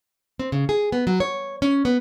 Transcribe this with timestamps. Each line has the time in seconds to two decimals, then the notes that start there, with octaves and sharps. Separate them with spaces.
0.39 C4
0.52 C#3
0.69 G#4
0.92 B3
1.07 F#3
1.20 C#5
1.62 C#4
1.85 B3